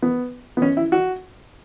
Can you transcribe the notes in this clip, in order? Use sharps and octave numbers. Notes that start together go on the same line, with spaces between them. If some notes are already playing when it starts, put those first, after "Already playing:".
B3
B3
C#4
E4
F#4